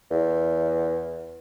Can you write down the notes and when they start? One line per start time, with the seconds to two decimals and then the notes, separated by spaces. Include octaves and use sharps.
0.11 E2